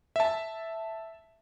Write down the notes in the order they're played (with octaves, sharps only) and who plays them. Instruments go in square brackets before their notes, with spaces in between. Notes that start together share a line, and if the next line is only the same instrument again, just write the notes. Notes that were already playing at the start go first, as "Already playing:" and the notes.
[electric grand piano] E5 A5